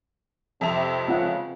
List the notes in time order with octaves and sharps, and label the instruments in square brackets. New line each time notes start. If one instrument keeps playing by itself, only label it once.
[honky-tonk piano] F2 E5 F7 [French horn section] C3
[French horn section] G#2 C#3 [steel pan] C4 F4 F#5